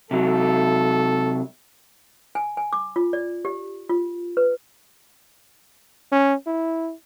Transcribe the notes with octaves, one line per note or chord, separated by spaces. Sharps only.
C3 F#3 A4
G#5
G#5
D6
F4
D5
G4
F4
B4
C#4
E4